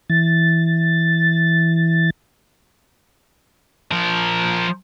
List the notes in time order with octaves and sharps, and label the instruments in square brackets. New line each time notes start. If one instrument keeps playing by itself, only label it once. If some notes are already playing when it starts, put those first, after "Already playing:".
[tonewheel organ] E3 A6
[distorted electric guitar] F3 A#4